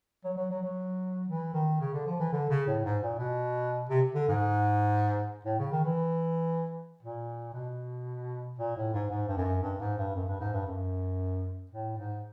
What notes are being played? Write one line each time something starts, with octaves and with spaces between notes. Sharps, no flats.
F#3
F#3
F#3
F#3
E3
D#3
C#3
D3
F3
E3
D3
C#3
A2
G#2
A#2
B2
C3
D3
G#2
A2
C#3
D#3
E3
A#2
B2
A#2
A2
G#2
G#2
G2
F#2
G2
G#2
G2
F#2
G2
G#2
G2
F#2
A2
G#2